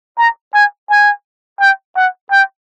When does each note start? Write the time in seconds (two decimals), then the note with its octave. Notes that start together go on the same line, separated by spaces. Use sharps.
0.18 A#5
0.54 G#5
0.89 G#5
1.60 G5
1.96 F#5
2.31 G5